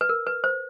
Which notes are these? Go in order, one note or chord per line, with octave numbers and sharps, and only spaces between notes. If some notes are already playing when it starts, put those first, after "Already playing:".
B4
A#4
B4
C5